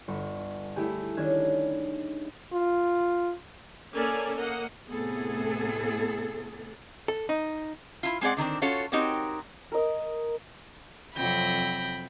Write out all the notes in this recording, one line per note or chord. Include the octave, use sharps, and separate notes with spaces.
G1 C#6
A3 E4 G4 G#4
D#3 C#4 D4 G#6
F4
A#3 C#4 A4 A#4 D5 G#5
A#3 D#5 F#5
A2 C3 B3 G#4 A4
A4
D#4
E4 F4
G#3 C4 G#4 D5 F#5
D3 D#3 C4 D4
C#4 F4 F#4 A4 C#5
C4 D#4 F#4 G4 A#4 C#5
A#4 D#5
F2 C3 F#3 G5 B5 A#6